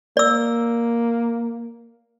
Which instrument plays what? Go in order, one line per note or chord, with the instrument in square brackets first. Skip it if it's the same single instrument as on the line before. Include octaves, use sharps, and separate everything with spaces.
[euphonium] A#3 [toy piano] D5 E6